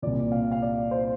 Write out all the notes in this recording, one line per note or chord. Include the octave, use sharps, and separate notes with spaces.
C2 A#2 D5
F5
F5
D5
C5